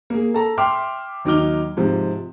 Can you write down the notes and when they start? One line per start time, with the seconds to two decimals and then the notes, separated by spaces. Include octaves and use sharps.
0.10 A#3 G#4
0.34 A4 A5 A#5
0.57 E5 G5 C6 D6 F6
1.25 D#2 F#3 D#4 D6 F6 G7
1.77 G#2 C3 F3